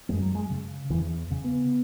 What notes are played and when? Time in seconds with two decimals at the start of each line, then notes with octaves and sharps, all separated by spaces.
0.09 F#2 G#3
0.22 F#3
0.35 G#3
0.50 C#3
0.90 E2 E3
1.31 C#3
1.44 B3